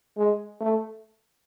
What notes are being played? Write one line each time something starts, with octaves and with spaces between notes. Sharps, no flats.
G#3
A3